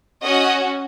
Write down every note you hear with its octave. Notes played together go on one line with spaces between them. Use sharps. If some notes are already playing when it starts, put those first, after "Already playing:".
C#4 F#4 D#5